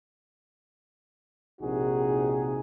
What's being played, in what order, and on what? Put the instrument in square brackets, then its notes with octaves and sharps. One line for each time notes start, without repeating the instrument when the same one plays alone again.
[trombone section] A#1 C3 D#4 F#4 G#4